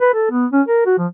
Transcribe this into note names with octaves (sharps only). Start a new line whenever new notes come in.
B4
A4
B3
C#4
A#4
F#4
F3